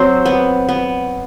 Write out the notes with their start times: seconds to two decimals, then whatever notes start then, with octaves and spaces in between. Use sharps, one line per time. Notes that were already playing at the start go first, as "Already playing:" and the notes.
Already playing: F#3 C4 C5
0.25 B3
0.69 B3